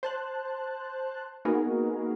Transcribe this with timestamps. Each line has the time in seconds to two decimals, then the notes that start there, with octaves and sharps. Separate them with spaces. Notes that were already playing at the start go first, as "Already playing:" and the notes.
0.03 C5 A5 F#6
1.45 A#3 B3 D#4 F#4 G#4 A#4